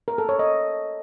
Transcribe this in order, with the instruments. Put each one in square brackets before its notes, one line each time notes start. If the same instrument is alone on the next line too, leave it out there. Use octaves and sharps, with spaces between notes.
[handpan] A#4
A4
C#5
D#5